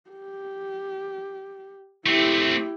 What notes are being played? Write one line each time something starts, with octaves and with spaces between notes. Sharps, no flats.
G4
A3 C4 E4 G4